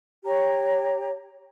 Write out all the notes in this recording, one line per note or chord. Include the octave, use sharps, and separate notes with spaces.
G4 C#5 A#5